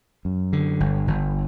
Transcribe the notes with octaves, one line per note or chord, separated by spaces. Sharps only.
F#2
D3
G1
G1